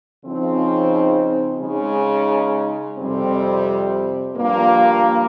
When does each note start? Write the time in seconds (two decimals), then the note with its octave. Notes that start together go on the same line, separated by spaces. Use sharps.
0.23 C#3 F3 C4 D#4
1.60 C#3 G#3 D#4
2.97 F2 C3 G3 C4
4.35 G2 F3 A#3 F4